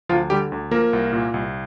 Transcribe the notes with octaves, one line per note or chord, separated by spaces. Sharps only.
D2 F3 F4
D3 G3 G4
D2
F3 A#3 A#4
C2
A#2
C2